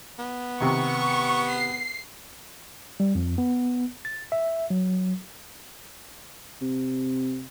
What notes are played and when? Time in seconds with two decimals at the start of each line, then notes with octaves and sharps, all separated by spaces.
0.19 B3
0.60 C3 D#3 C#6
1.50 C7
3.00 G3
3.15 F2
3.38 B3
4.05 A6
4.32 E5
4.70 F#3
6.61 C3